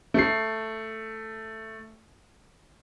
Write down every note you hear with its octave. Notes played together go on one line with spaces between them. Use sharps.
A3 C7